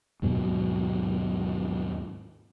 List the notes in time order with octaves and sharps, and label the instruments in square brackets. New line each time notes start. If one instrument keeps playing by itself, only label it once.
[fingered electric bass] D#2 G#2 B2 F#3